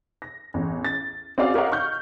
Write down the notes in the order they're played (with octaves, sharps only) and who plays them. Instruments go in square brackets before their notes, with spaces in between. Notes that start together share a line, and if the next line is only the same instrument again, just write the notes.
[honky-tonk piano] A#6
A1 E2
A6
C4 C#4 F#4 G#4 D5 F5
G4 A#4 C#5 D#5 F5 F#5
C#6 F6 G6